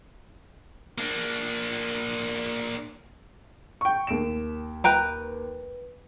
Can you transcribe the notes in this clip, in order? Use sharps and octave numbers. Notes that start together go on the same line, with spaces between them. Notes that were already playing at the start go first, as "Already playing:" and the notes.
A#3 D4
G5 C#6
D#2 D7 E7
B4 G5 A#5